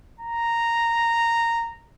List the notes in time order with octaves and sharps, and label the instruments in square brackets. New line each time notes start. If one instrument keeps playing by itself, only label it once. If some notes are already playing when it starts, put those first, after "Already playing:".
[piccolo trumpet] A#5